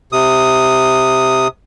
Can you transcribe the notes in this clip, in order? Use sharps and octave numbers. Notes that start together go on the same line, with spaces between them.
C3 D#6